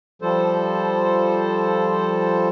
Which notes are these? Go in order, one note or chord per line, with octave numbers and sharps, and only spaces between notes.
F3 G3 A4 C5